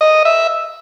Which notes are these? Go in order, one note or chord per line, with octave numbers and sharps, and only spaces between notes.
D#5
E5